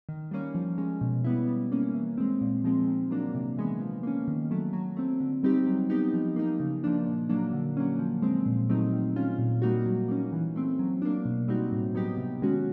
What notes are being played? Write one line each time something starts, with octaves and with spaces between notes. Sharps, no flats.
D#3
G3 A#3 C#4
F3
G#3 C#4
B2
G3 B3 E4
G3
A#3 C#4
E3
G#3 C4
A#2
F3 G#3 C4
D#3
F#3 A#3 D4
C3
E3 G#3 B3
F3
A#3 C#4
D#3
F#3 A3
F#3
A3 C4
D3
G3 C4 D#4 G4
F#3
B3 D#4 G4
F3
A#3 D#4
C#3
F3 A#3 D4
A#2
F#3 A#3 D4
D3
F#3 A#3 C#4
F3
G#3 C4
A#2
F#3 A3 C4 D#4
D#3
G#3 C#4 F4
A#2
G3 A#3 D#4 F#4
F#3
A#3 C#4
E3
A3 C4
F#3
A#3 D4
B2
G3 C4 D#4 F#4
A2
F#3 B3 D#4 G4
C3
D#3 G#3 C#4 F#4